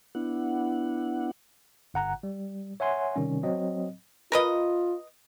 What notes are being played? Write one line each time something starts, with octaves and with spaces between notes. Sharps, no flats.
B3 D4 E4 F#5
G1 F#5 A#5 F#6
G3
C#5 E5 F#5 G#5 C6
C3 D#3 G3 C#4
F#3 C4 D#5
F4 A#4 B4 D#5